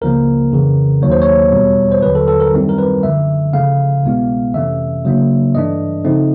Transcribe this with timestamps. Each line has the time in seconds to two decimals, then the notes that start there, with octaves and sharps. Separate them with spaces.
0.01 C#2 C#3 F3 A#3 A#4
0.52 F2 C#3 E3
1.02 D#2 D#3 F#3 A#3 C#5
1.12 C5
1.22 C#5
1.52 E2 B2 G3
1.92 C5
2.02 D#2 D3 F#3 B4
2.15 A4
2.28 A4
2.40 A#4
2.53 F#2 D#3 G3 C4 E4
2.69 A#4
2.78 B4
3.03 F#2 D3 F3 A3 E5
3.53 C#3 F3 A3 F5
4.03 C2 B2 G#3 B3 E4
4.54 F2 C3 E3 A3 C#4 E5
5.05 C#3 F#3 A#3 D4
5.55 G2 E3 A3 D4 D#5
6.04 C#3 F3 A3 C4 D#4